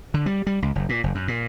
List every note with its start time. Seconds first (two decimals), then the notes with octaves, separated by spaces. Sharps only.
0.14 D3
0.26 G3
0.47 G3
0.62 C#2
0.75 F#1
0.89 A#2
1.04 F#1
1.15 F#2
1.28 A#2